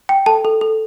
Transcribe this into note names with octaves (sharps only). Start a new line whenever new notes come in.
G5
A4 A5
A4
A4